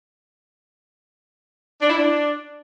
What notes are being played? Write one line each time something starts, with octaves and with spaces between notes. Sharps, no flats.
D4
E4
D4